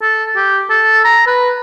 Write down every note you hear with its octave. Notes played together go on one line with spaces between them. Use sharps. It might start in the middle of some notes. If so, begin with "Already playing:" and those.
A4
G4
A4
A#5
B4